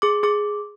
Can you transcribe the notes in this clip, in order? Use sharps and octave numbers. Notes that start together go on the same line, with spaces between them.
G#4 D6
G#4 D6